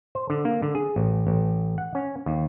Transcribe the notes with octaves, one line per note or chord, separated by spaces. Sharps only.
C5
D3
A#3
D3
G#4
A1
A1
F#5
C#4
D#2